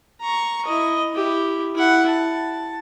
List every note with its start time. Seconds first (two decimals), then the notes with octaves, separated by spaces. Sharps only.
0.21 A#5 C#6
0.65 E4 D#5
1.12 E4 G4
1.75 E4 F#5
2.09 A5